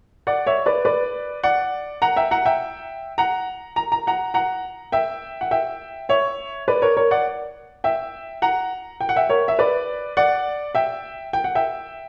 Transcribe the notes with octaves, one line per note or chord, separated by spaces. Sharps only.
D5 F#5
C#5 E5
B4 D5
B4 D5
D5 F#5
F#5 A#5
E5 G5
F#5 A#5
E5 G5
F#5 A#5
A#5
A#5
F#5 A#5
F#5 A#5
E5 G5
F#5
E5 G5
C#5 E5
B4 D5
A#4 C#5
A#4 C#5
D5 F#5
E5 G5
F#5 A#5
G5
F#5
E5 G5
A#4 C#5
E5
B4 D5
D5 F#5
E5 G5
G5
F#5
E5 G5